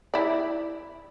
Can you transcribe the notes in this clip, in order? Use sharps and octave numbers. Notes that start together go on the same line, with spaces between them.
E4 D5